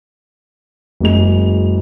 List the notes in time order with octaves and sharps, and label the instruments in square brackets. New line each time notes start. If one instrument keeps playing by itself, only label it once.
[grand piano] F#1 F#3 G#3 F7